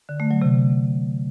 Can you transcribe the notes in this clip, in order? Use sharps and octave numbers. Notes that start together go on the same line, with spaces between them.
D3
A3
F#3
C3